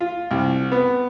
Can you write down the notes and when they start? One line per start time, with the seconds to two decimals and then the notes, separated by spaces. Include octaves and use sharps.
0.01 F4
0.31 C2
0.72 B3